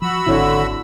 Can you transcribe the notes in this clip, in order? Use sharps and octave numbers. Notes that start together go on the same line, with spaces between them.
F3 F#4 B5 E6
G#1 D3 C4 E4 C#5